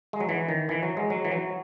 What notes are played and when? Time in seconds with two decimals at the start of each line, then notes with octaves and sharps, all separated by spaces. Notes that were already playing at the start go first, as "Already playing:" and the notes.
0.13 G#3
0.21 F#3
0.29 E3
0.49 D#3
0.69 E3
0.83 F#3
0.97 G#3
1.10 F#3
1.25 E3
1.31 F#3